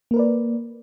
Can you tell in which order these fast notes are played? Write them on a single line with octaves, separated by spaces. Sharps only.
A#3 A#4 B4 D5